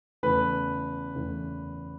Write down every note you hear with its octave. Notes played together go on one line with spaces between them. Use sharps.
E2 C#3 E3 A3 B4
E2 C#3 E3 A3